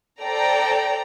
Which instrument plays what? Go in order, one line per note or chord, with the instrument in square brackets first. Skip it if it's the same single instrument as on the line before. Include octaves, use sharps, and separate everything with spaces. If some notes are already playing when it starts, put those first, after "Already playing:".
[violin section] A4 C5 D5 G5 A#5